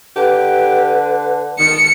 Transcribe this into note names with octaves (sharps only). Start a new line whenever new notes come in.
D3 G4 B4
D#3 C#7